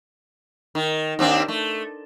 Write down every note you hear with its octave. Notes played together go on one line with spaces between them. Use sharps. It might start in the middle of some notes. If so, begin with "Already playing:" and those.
D#3
D#2 C4 D4
A3